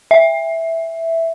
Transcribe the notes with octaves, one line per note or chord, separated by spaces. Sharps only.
E5